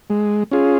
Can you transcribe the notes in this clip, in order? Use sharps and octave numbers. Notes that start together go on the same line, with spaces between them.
G#3
C#4 F4 G#4